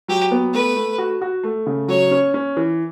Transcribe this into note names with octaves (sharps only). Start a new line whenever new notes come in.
F#3 G4
B3
A3 B4
A3
F#4
F#4
A3
C#3
F#3 C#5
C#4
C#4
E3